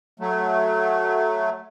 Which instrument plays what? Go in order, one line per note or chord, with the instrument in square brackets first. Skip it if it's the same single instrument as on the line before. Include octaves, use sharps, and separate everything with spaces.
[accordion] F#3 A3